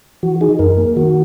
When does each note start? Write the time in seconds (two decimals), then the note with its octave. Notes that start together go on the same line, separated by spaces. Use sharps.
0.23 E3 F#4
0.41 D#4 G#4
0.59 F#2 A#4
0.78 A#3
0.96 D#3 F#4